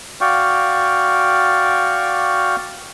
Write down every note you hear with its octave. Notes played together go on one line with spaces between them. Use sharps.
F#4 D5 F5 G5 C#6